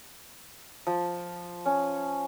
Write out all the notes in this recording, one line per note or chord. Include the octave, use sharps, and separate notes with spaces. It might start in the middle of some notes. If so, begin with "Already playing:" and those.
F3
C#4